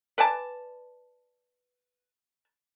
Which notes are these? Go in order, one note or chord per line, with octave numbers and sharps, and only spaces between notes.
B4 D5 G#5 A5